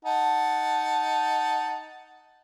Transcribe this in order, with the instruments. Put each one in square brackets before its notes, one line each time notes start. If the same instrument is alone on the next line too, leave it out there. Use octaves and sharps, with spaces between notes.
[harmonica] D#4 F#5 A5